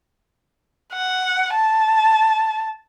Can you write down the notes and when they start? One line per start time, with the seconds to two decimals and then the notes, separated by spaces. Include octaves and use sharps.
0.93 F#5
1.54 A5